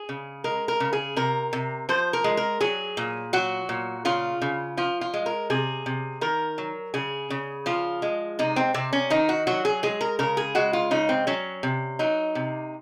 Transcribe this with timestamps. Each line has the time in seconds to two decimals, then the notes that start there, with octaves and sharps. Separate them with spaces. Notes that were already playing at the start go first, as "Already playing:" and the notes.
Already playing: G#4
0.09 C#3
0.44 G#3 A#4
0.68 A#4
0.80 C#3
0.93 G#4
1.16 C3 A#4
1.53 C3
1.89 F3 C5
2.13 A#4
2.24 G#3
2.37 A#4
2.60 F#3 G#4
2.97 A#2
3.33 F#3 F#4
3.69 A#2
4.05 C#3 F4
4.42 C#3
4.77 F3 F4
5.01 F4
5.14 G#3
5.26 A#4
5.50 C3 G#4
5.86 C3
6.21 D#3 A#4
6.58 F#3
6.94 C#3 G#4
7.30 C#3
7.66 F3 F4
8.02 G#3
8.39 C3 D#4
8.56 C4
8.74 C3 C4
8.93 C#4
9.10 D#3 D#4
9.29 F#4
9.47 F#3 F#4
9.65 G#4
9.83 G#3 G#4
10.01 A#4
10.19 C#3 A#4
10.37 G#4
10.55 G#3 F#4
10.73 F4
10.91 C#3 D#4
11.09 C4
11.27 F#3 C#4
11.63 C3
11.99 F#3 D#4
12.35 C3